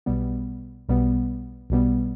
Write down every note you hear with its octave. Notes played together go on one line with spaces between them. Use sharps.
B1 B2 G3 B3
B1 B2 G3 B3
B1 B2 G3 B3